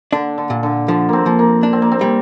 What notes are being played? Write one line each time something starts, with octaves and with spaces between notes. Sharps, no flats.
D3 D4
D3
A#2
D3
D3 F3
A#3 C4
F3
A#3
D4
C4
A#3
C4
G3